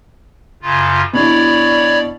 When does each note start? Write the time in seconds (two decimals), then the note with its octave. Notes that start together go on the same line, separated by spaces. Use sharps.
0.62 F#2 C#3 F4
1.13 B2 D4 E4 C#5 D5 B5